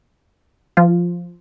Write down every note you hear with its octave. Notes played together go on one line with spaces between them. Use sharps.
F3 F4